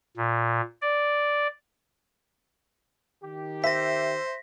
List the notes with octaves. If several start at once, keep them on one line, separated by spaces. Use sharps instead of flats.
A#2
D5
D#3 G4
C5 E5 A#6 B6